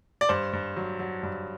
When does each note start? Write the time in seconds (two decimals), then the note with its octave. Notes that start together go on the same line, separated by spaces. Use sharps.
0.21 D5
0.29 G2 C5
0.53 G2
0.77 F#3
0.99 F#3
1.23 G2